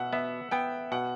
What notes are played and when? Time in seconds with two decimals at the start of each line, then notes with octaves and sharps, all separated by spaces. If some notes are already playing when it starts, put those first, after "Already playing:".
Already playing: B2 E5 F#5
0.13 B3 E5
0.51 B3 G5
0.92 B2 F#5